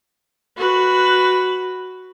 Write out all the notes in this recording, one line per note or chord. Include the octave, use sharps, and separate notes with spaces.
F#4 B4